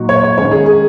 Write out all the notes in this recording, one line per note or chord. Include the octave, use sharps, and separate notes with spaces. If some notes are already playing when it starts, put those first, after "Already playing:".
Already playing: A#2 F#3 D#4 F#4
C#5
C#5
D#3 G#3 C#4 C#5
G#4
G#4